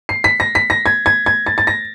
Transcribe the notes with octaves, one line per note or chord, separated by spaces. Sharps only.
C7
B6
A#6
B6
A#6
G#6
G#6
G#6
A6
A6
A#6